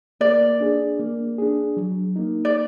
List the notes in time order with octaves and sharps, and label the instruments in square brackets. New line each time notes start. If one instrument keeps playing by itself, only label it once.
[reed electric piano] A#3 [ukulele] D5
[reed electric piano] D4 G#4
A#3
D4 G#4
F#3
A#3 D#4
[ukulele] D5